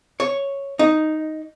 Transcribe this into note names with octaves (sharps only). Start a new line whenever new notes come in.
C#5
D#4